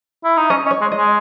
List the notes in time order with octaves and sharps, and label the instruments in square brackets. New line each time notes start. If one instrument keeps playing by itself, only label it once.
[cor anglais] E4
D#4
[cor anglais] C#4 [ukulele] D#5
[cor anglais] C#4
[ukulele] C#5
[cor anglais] G#3
[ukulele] D#5
[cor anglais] G#3